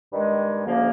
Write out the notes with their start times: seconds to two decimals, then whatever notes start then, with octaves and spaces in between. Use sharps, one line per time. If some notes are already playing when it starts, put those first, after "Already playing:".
0.12 G2 D#3 G#3
0.66 D2 C#3 F3 A#3